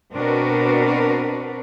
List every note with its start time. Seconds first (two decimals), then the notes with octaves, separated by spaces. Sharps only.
0.12 B2 C4 D4 F#4 A#4 B4